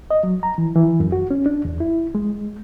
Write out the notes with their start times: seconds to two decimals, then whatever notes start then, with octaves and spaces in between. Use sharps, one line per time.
0.11 D#5
0.23 F#3
0.43 A#5
0.58 E3
0.76 E3
1.00 F#2
1.12 F#4
1.31 C#4
1.46 D4
1.65 E2
1.80 E4
2.15 G#3